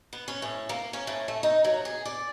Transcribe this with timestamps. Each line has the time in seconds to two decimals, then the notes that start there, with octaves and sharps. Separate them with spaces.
0.13 B3
0.28 C#4
0.42 A2
0.69 A#3
0.93 C#4
1.07 A2
1.28 A3
1.43 D#4
1.64 F#3
1.85 G#4
2.05 D5